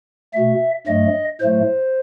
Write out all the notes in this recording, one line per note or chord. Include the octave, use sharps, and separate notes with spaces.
B2 A3 E5
G2 F#3 A3 D#5
A2 F#3 A3 C5